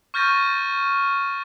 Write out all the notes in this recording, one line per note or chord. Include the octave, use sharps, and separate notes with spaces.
C#6 F6 G6 A6 A#6 D#7